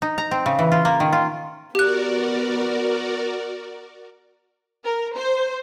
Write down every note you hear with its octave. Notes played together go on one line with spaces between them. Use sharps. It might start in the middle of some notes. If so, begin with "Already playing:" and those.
D#4
A#5
C4
C#3
E3
F4
A#3
D#3
F4
B3 F#4 G4 A#4 D5 F#6
A#4
C5